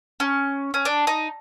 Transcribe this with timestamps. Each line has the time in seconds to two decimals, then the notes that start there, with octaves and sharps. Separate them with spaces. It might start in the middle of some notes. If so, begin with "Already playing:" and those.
0.20 C#4
0.74 C#4
0.85 D4
1.07 D#4